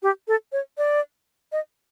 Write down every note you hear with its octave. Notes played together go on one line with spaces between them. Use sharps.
G4
A4
C#5
D5
D#5